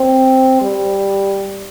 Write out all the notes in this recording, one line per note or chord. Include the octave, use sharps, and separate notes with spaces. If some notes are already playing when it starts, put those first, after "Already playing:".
Already playing: C4
G3